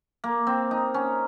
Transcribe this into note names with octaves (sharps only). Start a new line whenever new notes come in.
A#3
C4
D#4
C#4